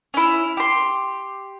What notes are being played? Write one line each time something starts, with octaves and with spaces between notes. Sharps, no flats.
C#4 E4
G4 C6